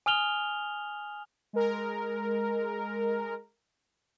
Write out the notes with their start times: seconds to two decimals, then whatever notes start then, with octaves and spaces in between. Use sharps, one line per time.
0.06 G#5 D#6 F6 F7 G7
1.53 G#3 A#4